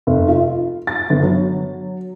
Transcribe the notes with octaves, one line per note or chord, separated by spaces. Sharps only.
F1
F4
A6
G1
F#3